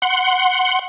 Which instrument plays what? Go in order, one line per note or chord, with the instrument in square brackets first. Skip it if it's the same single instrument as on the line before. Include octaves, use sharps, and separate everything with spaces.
[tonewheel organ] F#5 C6